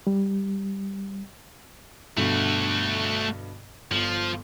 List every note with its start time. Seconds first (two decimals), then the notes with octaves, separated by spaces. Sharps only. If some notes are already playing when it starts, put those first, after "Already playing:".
0.07 G3
2.17 G2 B2 D3 A3 F#4
3.91 G1 F3